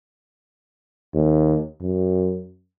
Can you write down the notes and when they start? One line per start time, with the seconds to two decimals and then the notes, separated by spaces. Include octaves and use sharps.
1.14 D#2
1.81 F#2